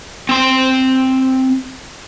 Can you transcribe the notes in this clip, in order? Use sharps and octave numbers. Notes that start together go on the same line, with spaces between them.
C4 C6